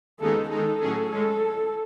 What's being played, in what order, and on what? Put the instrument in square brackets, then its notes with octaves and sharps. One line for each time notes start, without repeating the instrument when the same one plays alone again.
[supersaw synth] D#2 C#3 G#3 B3 D#4 [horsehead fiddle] A4
[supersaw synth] D#3 G#3 D#4 [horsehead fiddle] A4
[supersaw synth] A2 F#3 C#4 G#4
[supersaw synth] G#3 C#4 [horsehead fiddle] A4